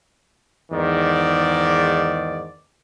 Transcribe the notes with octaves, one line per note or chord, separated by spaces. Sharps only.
E2 G#2 D#3 D5